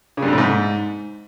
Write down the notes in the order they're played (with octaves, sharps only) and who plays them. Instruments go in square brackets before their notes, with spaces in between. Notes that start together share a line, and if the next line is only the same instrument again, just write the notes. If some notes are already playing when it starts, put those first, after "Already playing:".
[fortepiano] C#3
G2
F2
A2
G#2